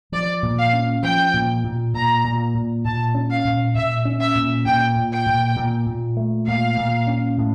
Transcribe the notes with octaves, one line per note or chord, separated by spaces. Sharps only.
F3 D5
A#2
F5
C#4
F3 G5
A#2
A#2
A#2 A#5
A#2
A#2
A#2 A5
C#4
F5
A#2
A#2 E5
C#4
E5
A#2
A#2 G5
A#2
G5
A#2
A#2
A#2
A3
A#2 F5
A#2
C#4
A2